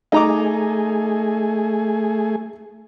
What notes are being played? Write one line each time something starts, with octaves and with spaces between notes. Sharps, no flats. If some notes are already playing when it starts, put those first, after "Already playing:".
A3 D#4 G#4 A#5 D6